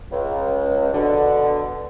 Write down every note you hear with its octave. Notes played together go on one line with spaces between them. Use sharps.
C#2
B2 D3